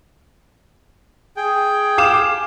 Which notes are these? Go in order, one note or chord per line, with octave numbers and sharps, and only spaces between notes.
G#4 G5
F5 D6 E7